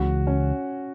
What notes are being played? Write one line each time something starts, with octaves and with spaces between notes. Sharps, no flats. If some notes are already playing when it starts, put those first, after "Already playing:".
Already playing: C#2 C#3 E3 F#4
C#4